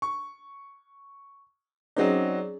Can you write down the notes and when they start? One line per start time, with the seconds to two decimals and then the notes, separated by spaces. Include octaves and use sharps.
0.02 C#6
1.97 F#3 C4 C#4 D#4 G#4 D5